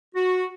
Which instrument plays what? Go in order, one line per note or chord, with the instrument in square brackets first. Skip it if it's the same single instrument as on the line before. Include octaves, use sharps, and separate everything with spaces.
[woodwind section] F#4